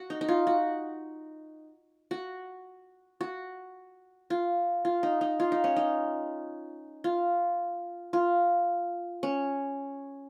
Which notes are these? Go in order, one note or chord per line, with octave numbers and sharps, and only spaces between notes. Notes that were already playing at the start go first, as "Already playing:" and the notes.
Already playing: F#4
D#4
D#4
F4
F#4
F#4
F#4
F4
F4
D#4
D#4
F4
D#4
C#4
D#4
F4
F4
C#4